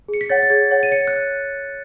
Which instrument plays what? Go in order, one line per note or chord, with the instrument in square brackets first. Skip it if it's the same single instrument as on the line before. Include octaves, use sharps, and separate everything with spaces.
[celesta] G#4
[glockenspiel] C#7
B6
[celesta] C#5 F#5 [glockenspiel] A6
[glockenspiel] A6
[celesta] G#4 [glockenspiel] G#6
[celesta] C#5 F#5
[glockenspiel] D#7
[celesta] C#5 [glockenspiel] C#7
[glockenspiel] F#6